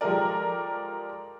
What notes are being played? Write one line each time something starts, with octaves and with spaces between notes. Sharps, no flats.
F3 G#3 G4 A4 A#4 D5